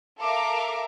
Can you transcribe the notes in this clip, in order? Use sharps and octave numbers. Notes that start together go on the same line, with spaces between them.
A4 A#4 E5 F5 A#5 D6